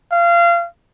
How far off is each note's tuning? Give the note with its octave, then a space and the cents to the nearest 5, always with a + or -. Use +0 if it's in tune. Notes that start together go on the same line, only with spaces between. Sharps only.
F5 -25